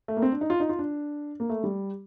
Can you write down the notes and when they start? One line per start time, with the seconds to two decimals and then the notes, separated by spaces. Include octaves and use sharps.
0.08 A3
0.17 A#3
0.22 C4
0.32 D4
0.41 D#4
0.50 F4
0.60 D#4
0.69 F4
0.79 D4
1.40 A#3
1.50 A3
1.64 G3